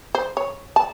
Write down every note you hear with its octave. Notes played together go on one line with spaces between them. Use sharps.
C5
C#5
A5